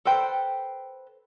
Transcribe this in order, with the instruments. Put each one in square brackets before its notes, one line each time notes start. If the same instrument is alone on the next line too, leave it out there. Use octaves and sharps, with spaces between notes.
[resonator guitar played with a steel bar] A4 B4 C5 G5